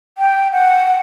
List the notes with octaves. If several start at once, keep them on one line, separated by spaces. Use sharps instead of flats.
G5
F#5